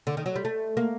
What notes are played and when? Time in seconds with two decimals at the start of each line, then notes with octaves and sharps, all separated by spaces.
0.07 D3
0.17 D#3
0.26 F#3
0.36 G3
0.45 A3
0.77 A#3